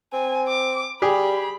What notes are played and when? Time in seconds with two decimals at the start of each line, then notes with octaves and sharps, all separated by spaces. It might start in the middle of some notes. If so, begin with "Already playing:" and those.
0.13 C4 G#5
0.48 D6
1.02 G3 G4 G#4 B5